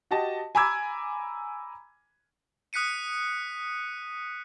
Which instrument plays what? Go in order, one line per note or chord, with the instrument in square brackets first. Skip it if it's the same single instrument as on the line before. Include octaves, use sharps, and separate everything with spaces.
[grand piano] F#4 G4 D#5 A5
G#5 A#5 B5 D6 E6 G#6
[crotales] D#6 F#6 B6 C#7 D#7